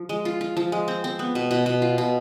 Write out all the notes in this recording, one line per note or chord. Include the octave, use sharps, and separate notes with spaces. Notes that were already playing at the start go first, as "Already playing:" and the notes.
Already playing: F3
G#3
F4
F4
F3
G#3
C4
C4
B3
B2
B2
B2
F4
B2